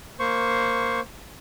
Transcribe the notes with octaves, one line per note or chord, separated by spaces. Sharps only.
A#3 C5 C#6